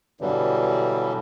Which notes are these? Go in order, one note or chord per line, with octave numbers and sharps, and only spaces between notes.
G2 B2 D3 E3 F#3 G3